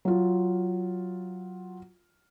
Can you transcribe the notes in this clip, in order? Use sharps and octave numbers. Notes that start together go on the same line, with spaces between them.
F#3 F4